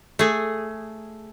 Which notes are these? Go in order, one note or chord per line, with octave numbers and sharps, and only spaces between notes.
A3 G#4